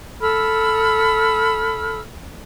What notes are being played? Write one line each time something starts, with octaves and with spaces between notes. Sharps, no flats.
A4 B5 E6 F6